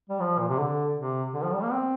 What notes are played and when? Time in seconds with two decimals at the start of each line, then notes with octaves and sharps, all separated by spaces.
0.10 G3
0.20 F3
0.39 A#2
0.49 C3
0.59 D3
0.97 C3
1.34 D3
1.44 F3
1.53 G3
1.63 A#3
1.72 C4